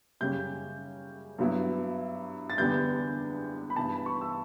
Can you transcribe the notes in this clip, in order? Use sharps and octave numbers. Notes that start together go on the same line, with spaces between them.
F#2 C#3 G3 C#4 G6
G2 F#3 B3 E4
A6
E2 D3 G3 B3 D4 G6
B5
G2 E3 B3 A5
B5
C#6
E6